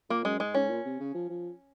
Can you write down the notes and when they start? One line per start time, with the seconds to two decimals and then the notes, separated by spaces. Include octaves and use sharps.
0.10 A#2 A#3
0.25 F#2 G#3
0.40 G#2 G#3
0.54 G#2 C#4
0.69 A#2
0.85 C3
1.00 C#3
1.14 F3
1.29 F3